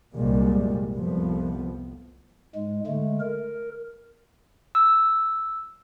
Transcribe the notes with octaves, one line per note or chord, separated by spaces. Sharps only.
C2 F#2 A#2 G3 G#3 A#3
C2 F2 A2 F3 B3
G#2 G#3
D3 G#3 A3
A#4
E6